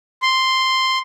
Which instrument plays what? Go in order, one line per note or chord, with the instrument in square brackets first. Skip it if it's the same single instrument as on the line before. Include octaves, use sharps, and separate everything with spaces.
[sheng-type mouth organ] C6